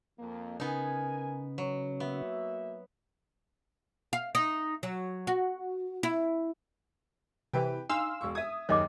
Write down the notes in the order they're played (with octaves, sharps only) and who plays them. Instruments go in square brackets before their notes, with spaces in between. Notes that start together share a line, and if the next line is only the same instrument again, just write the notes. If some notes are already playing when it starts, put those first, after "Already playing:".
[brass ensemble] F2 A#3
[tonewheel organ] C#3 [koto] B3 D#4 [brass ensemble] A#4 G#5
[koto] F#3
[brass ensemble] A#3 F#4 E5 [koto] B3
[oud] F5
D#4
F#3
F#4
E4
[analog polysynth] C3 E3 [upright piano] G4 B4 G5
[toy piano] D4 [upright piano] D#4 [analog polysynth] F5 C6 E6
[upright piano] E1 C#6
[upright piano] E5 G#6 [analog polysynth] D#6
[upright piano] F#1 D#2 D#3 [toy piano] C#5 D#5 D6